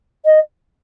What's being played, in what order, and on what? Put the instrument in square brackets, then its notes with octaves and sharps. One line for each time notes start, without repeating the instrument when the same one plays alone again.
[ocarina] D#5